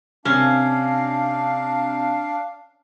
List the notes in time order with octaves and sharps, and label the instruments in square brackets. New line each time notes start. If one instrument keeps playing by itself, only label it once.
[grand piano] C3 [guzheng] C#4 [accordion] D4 F5